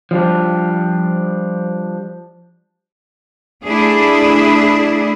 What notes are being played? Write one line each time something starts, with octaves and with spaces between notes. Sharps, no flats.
F3 G3 D4
A3 D4 E4 G#4